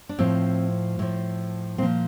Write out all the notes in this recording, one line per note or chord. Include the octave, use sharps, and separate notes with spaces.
D4
A2 F3 C4
A2 F3
A#2 F3 C4